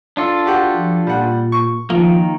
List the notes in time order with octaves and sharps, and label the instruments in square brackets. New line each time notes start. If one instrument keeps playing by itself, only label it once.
[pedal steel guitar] D4 F4 A4
[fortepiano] F#4 G4 F#5
[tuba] F3
[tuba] A#2 [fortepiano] G3 F#5
[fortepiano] C#6
[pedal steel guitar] D#3 A#3 [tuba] F3